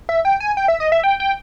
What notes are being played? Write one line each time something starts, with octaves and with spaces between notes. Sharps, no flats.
E5
G5
G#5
G5
E5
D#5
E5
G5
G5